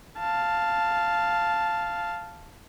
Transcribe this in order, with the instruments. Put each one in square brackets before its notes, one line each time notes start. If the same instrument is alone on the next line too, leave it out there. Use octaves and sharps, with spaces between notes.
[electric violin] F5 A5